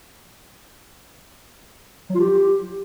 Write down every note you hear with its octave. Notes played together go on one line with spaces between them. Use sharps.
F#3
F4
G4